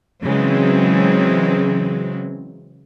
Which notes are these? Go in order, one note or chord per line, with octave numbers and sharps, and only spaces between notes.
C#3 E3 F#3 G#3 C4